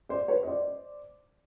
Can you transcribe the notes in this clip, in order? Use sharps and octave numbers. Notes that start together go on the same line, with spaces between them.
C5 D5
B4 C#5
D#5
C5 D5